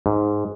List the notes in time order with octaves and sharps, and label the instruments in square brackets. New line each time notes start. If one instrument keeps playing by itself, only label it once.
[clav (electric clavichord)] G#2